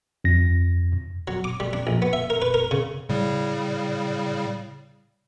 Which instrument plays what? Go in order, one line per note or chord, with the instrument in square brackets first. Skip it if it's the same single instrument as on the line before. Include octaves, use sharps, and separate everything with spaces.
[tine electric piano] F2 A#6
[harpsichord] F#3
D6
G3
D4
A#1
B3
E5
A#4
B4
A#4
C#3
[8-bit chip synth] A2 C#3 G3